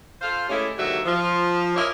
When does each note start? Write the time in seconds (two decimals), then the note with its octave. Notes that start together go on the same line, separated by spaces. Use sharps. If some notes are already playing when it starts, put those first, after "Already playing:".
0.22 F4 A4 C5 F5
0.49 G#3 A3 C#4 E4 G4
0.78 D#2 G#2 D3 F#3 G4 E5
1.06 F3
1.76 E4 F4 G4 A#4 C#5 D#5